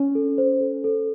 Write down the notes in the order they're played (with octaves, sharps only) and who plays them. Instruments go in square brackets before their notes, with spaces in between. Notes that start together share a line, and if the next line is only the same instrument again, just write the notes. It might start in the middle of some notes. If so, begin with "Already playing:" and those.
Already playing: [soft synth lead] C#4
[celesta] A4
C5
A4
A4